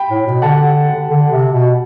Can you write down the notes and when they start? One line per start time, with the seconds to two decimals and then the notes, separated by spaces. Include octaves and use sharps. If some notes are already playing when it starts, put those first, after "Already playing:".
Already playing: G5 B5
0.10 A2
0.26 B2
0.42 D3 F#5 A5
1.08 D3
1.30 C3
1.52 B2